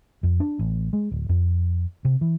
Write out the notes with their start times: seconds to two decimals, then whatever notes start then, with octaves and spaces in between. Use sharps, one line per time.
0.23 F2
0.40 D4
0.59 A1
0.93 G#3
1.11 D1
1.29 F2
2.05 C3
2.21 E3